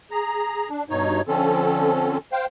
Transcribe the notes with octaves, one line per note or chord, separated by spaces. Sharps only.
G#4 A#5
D4
G2 B2 D#4 C#5
D3 F3 C4 C#4 A4
C5 F5 G5